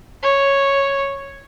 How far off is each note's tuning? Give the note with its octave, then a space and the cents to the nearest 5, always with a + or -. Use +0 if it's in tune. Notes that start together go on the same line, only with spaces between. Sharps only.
C#5 -5